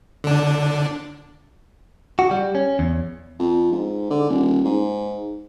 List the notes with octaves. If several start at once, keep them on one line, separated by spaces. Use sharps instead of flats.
D3 D4
F#4
G3
C#4
E2
F2
G#2
D3
D#1
G#2